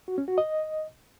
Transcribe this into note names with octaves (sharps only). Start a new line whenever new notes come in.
F#4
C#4
F#4
D#5